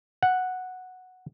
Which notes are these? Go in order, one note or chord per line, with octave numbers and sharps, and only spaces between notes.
F#5